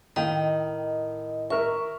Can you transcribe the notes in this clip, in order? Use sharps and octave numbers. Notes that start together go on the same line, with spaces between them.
A2 D#3 D#5 F5 G5
A#4 E5 C#6